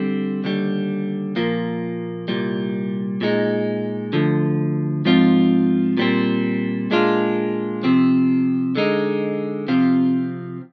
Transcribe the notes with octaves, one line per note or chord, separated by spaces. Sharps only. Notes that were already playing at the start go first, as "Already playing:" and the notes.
Already playing: D3 G3 C4
D#2 D3 G3
A#2 F3 A#3
C2 A#2 G3
A#2 G#3 D#4
D2 D3 F3
G#2 F3 C4 F4
A#2 G3 C4
A#2 G#3 D4 F4
C3 F3 C4
D3 G#3 D#4
C3 F3 C4 F4